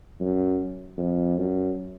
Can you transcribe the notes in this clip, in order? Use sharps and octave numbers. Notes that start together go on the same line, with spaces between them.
F#2
F2
F#2